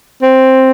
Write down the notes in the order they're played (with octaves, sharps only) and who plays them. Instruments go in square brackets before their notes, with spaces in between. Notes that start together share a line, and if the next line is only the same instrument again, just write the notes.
[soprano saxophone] C4